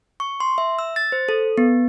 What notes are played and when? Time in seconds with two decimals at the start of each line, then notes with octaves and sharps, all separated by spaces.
0.20 C#6
0.40 C6
0.58 E5
0.79 E6
0.96 A6
1.12 C5
1.29 A4
1.58 B3